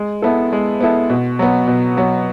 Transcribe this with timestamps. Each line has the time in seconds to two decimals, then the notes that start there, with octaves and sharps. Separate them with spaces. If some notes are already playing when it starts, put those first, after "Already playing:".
Already playing: G#3
0.22 B3 E4 A4
0.53 G#3
0.80 B3 E4 A4
1.10 B2
1.39 F#3 B3
1.67 B2
1.97 F#3 B3